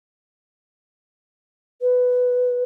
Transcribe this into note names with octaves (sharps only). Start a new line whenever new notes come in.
B4